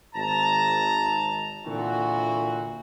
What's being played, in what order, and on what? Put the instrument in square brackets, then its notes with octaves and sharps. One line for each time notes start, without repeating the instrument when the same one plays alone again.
[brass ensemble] G#1 A5 A#5
A#2 D3 E3 C4 F#4